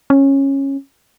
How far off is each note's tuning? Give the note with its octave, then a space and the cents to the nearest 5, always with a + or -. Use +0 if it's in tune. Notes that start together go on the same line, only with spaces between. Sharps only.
C#4 -15